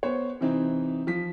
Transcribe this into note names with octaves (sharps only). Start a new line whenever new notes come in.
B3 C5 C#5
C3 E3 C4 D#4
F3 B6